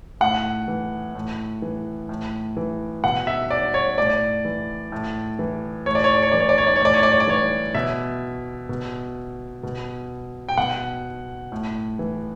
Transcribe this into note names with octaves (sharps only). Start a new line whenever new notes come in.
A2 F#5
E3
A2
E3
A2
E3
B2 F#5
E5
D5
C#5
A2 D5
E3
A2
E3
A2 C#5
D5
C#5
D5
C#5
E3 D5
C#5
D5
C#5
D5
C#5
A2 D5
C#5
D5
C#5
D5
E3 C#5
B2 E5
B2
B2
G5
B2 F#5
A2
E3